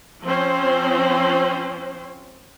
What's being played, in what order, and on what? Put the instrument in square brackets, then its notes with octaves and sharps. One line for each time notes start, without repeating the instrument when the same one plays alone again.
[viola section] F3 C4 C#4 C5